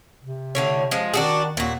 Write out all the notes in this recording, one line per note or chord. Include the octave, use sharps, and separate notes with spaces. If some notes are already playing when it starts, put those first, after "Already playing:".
C3
A2 D3 C#5
F3 G#3
D#3 D4 F#4 G#4
D#2 A#2 F#4